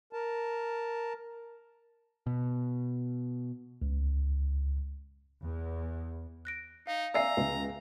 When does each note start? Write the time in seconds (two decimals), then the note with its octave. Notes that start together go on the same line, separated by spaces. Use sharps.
0.13 A#4 A5
2.27 B2
3.82 C#2
5.43 E2
6.45 F#6 A#6 D7
6.87 D#4 F5
7.14 D5 E5 F5 G#5 A#5 E6 C7
7.37 C#2